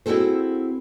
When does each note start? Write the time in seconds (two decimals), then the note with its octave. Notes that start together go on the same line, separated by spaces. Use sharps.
0.06 C4 E4 F#4 G#4 A4 C5